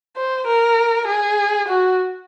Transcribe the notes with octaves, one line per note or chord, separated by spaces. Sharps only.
C5
A#4
G#4
F#4